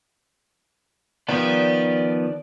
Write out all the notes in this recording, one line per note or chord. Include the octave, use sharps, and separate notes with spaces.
D#3 F3 B3 D5 G5